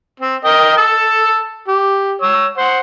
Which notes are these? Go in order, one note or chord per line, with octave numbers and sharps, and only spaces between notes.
C4
A#4 D#5 G5
A5 E6
G4
C#5 E6
C5 F#5